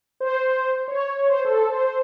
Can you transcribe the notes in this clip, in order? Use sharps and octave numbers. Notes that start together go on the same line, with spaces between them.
C5
C#5
C5
A4
C5